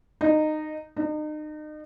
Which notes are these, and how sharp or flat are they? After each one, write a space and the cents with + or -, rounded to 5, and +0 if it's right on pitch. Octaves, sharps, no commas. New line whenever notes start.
D#4 -15
D#4 -35